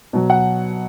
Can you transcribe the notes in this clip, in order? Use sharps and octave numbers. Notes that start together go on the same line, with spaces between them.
B2 F#3
F#5